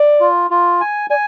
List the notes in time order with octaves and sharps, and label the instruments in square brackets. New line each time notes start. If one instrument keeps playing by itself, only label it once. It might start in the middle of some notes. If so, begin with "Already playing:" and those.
Already playing: [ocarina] D5
[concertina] F4
F4
G#5
[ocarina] D5 [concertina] G#5